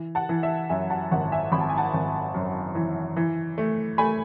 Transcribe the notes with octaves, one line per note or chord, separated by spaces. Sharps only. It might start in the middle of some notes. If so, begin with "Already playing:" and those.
Already playing: E3
F#5 A5
E3
E5
F#2 E5 G#5
F#5 A5
G#1 F#5
E5 G#5
G#1 B5
A5
G#5
F#5 A5
G#1
F#2
E3
E3
A3
A3 G#5 B5